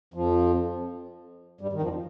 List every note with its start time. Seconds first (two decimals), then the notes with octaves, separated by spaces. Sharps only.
0.14 F2 F3
1.61 G2 G3
1.73 D#3
1.82 F2 F3